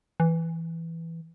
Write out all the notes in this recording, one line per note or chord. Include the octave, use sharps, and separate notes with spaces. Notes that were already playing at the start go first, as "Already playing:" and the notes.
E3